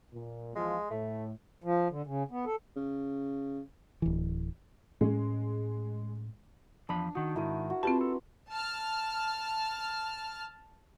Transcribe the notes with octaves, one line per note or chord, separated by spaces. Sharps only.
A#2
E2 F3 G#3 F4
A2 A3
F3
D3
C#3
B3
A4
C#3
D1 E3
A2 G#3 C#4
E2 F3 D4 B5
D#3 D#4 F#4
G#2 D#3 E4 A#4
F#4
C4 F4 G4 B4 A5 C6
A4
A5 F6